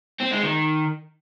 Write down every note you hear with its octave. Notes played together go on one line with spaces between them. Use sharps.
C4
G#3
D#3